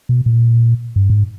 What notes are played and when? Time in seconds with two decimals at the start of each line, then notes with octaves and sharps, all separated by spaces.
0.09 B2
0.26 A#2
0.96 G2
1.10 G#2